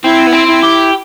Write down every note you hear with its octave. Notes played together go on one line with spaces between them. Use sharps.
C4 E4
B3
C4
E4
G4